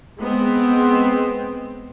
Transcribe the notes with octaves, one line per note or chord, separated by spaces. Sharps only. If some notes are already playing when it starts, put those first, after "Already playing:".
G#3 B3 C4